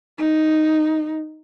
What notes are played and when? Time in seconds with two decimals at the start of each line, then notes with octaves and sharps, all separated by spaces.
0.18 D#4